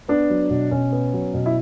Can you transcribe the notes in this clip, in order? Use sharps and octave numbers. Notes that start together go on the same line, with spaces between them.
B3 D4
F#3
B2
B2 C#4
B3
F#3
B2
E4